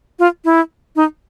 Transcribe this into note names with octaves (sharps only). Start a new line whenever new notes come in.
F4
E4
D#4